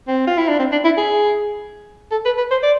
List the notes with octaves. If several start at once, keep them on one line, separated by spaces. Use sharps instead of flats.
C4
F4
E4
D4
C4
D4
E4
G#4
A4
B4
B4
C5
D5